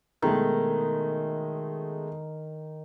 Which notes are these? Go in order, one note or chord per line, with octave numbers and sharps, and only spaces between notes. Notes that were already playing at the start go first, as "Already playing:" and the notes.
B2 D#3 G#3 A3